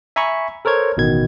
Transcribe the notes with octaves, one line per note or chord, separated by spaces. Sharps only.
E5 G#5 A#5 B5 C#6
A4 A#4 C5 C#5 G#6
A1 B2 D#3 G#6